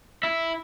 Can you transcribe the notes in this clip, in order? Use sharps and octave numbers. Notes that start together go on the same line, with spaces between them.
E4